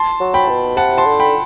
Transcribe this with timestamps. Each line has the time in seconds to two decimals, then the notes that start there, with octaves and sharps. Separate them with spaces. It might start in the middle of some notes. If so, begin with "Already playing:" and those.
Already playing: A5 C6
0.20 F#3
0.34 G5 B5
0.49 B2
0.77 C3 F#5 A5
0.98 A5 C6
1.05 D3
1.20 G5 B5